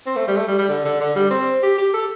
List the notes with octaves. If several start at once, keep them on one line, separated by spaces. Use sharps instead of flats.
C4
A3
G3
A3
G3
G3
D3
D3
D3
G3
C4
G4
G4
A4